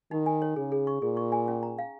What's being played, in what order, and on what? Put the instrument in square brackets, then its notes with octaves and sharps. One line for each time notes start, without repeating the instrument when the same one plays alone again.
[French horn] D#3 [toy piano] D#4
[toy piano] G#5
C#5
[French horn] C#3 [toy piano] G#4
[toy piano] G#4
C#6
[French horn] A#2 [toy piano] G#4
[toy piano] C#6
G#5
C#4
A#5
F5